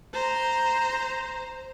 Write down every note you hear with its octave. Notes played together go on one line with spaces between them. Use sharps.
C5 A#5